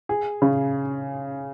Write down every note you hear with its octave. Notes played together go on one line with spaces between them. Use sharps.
G#4
C#3